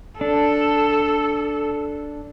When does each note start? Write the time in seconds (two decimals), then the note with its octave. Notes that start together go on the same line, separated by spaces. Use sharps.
0.21 D4 A4